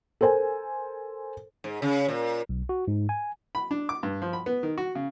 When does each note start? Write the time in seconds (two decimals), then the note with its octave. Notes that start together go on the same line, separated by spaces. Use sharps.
0.21 A4 A#4 C5 G#5
1.64 G#2
1.82 C#3
2.08 A#2
2.49 B1
2.69 F#4
2.88 G#2
3.09 G#5
3.55 B5
3.71 D4
3.89 D6
4.03 G2
4.22 F3
4.33 B5
4.46 B3
4.63 D#3
4.78 F#4
4.95 C#3